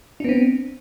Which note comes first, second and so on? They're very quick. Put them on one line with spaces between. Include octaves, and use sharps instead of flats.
D4 B3 C4